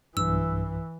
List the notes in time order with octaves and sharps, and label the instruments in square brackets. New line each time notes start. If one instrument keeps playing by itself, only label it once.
[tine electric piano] B1 G2 [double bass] E3 [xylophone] E6